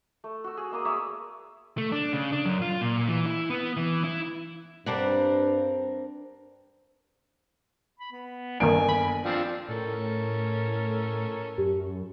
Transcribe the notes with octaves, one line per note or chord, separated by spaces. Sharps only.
A3
F#4 E6
G#4
G#3 A#3 A#5 D#6
C#5 D5 E5 A#5
A3
D4
C#3
D4
F#2
F4
A#2
E3
E4
B3
E3
E4
G2 G3 C4 D4 A#4 C5 F#5
B5
B3
G1 D#3 A#3 D4 G#5 D7
B5
F3 C4 D4
A2 C#4 A4 A#4
F#2 G4